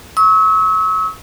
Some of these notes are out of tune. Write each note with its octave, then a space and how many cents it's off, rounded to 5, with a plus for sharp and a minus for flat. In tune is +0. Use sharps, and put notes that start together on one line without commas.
C#6 +0 E6 -40